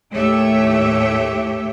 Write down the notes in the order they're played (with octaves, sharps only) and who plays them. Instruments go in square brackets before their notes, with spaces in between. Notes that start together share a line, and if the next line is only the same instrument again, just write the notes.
[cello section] D#2 A2 A3 G4 C#5 E5